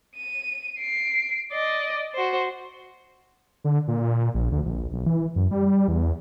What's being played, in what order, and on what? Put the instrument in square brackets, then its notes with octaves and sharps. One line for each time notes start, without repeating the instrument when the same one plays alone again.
[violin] D#7
C7 D7
D5 D#5
F#4 C5
[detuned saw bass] D3
A#2
A#2
A#1
D2
A#1
B1
E3
F#2
G3
G3
E2